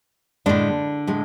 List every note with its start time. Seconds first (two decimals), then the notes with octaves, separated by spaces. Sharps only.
0.46 A2 D3 G#3 D4
1.07 A2 G#3